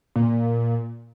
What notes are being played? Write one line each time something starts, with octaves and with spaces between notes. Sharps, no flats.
A#2